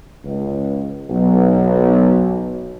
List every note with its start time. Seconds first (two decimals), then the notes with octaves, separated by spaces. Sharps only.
0.25 C#2
1.09 B1